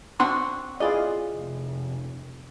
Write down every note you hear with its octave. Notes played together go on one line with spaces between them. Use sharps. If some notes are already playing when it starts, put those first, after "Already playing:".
F#3 C4 D4 F#4 F#5 C6
E3 F4 G#4 D5 D#5
F1